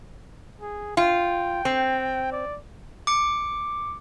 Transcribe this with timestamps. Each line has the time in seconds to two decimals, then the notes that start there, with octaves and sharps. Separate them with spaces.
0.61 G#4
0.97 F4 G5
1.65 C4
2.32 D5
3.07 D6 C#7